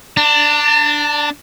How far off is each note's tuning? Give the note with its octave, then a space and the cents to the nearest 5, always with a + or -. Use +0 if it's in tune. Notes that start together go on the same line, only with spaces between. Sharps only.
D4 +0 A5 +45